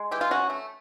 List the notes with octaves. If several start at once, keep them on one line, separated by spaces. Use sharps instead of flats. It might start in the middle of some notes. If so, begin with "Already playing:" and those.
Already playing: G#3
E3 G4
F4
C#4 F#4
A3